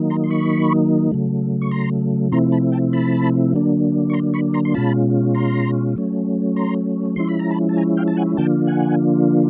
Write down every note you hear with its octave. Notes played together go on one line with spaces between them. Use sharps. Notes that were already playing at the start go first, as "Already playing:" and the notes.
Already playing: D#3 F#3 A#3 D#4
A#5 C6
C6
B5 C#6
C#3 F#3 A3
C#6
A#5 C6
C3 F3 A3 C4 E4 A#5 C6
A5 B5
G5 A5
A5 B5
D3 F#3 A#3 D4
C#6
A#5 C6
B5 C#6
A#5 C6
C6
B2 G#3 C#4 F4 A5 B5
A#5 C6
F#3 A3 C#4
A#5 C6
F3 G#3 C#4 E4 C6
B5
A#5
A5 B5
A5
G#5 A#5
F5 G5
A5
F#5 G#5
D3 F3 A#3 D4 F4 G5 A5
F#5 G#5